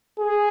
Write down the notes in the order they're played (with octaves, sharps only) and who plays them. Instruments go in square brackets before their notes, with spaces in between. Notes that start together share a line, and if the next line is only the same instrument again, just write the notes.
[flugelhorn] G#4